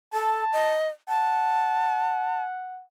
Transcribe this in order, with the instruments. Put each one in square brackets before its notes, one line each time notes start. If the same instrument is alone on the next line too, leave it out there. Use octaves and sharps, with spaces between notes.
[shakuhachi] A4 [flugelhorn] A5
[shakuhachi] D#5
[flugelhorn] F#5 [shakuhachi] A5